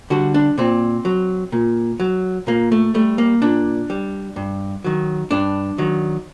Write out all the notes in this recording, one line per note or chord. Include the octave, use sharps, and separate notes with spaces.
D3 G3 F#4
D4
A#2 C4
F#3
A#2
F#3
A#2 A#3
A3
G3 A3
A#3
A#2 D4
G3
G2
D#3 F#3
G2 D4
D#3 F#3